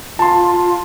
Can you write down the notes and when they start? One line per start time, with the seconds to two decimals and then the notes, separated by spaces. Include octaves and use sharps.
0.19 F4 A5 C6